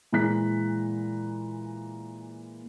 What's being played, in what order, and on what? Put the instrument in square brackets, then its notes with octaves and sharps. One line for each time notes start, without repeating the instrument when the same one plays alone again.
[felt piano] A#2 E3 G#3 A#5 F#6 B6